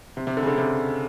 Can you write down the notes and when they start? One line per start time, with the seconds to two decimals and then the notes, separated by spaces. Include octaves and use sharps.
0.17 C3
0.27 C3
0.37 D3
0.43 C#3
0.47 D3
0.58 C3